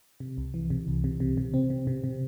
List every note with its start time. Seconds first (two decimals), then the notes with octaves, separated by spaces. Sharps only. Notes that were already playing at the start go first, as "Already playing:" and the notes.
0.20 C3
0.38 C2
0.54 E3
0.70 C3
0.87 C2
1.04 C3
1.20 C3
1.37 C3
1.54 C4
1.70 C3
1.87 C3
2.04 C3